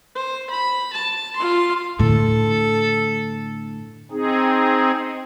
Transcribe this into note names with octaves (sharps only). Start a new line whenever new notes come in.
C5
B5
A5
F4 C6
A2 D3 A4
C4 D#4 G#4